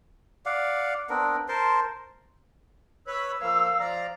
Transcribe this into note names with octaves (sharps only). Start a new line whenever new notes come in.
D5 F5 F#5
B3 C4 D4 A#4
A#4 C5 A5 C6
B4 C#5 B5 E6
F3 A#3 F5
F3 D5 A#5